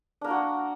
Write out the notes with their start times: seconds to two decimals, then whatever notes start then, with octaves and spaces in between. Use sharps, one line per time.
0.21 D4
0.24 A#3
0.27 A#4
0.30 F#4